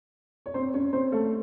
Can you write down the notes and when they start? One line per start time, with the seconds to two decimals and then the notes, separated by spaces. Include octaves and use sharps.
0.46 C#5
0.54 C4 C5
0.74 C#4 C#5
0.93 C4 C5
1.12 A3 A4